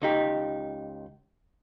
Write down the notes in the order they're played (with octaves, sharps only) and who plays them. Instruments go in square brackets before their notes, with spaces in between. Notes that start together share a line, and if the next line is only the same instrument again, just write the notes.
[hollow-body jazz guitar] C#2 D#4 G4